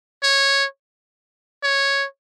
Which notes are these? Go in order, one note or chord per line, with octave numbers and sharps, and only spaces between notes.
C#5
C#5